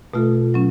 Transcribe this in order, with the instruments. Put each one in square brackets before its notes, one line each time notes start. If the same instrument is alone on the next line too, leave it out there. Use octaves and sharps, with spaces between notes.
[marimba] B2 A3 F4 A4
F#3 C#4